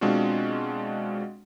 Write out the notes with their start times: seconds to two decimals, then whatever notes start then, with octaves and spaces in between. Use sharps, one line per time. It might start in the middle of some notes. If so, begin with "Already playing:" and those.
0.01 B2 G#3 C4 D4 F4 F#4